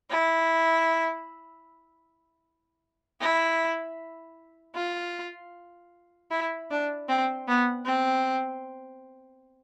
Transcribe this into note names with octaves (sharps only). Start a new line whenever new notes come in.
E4
E4
F4
E4
D4
C4
B3
C4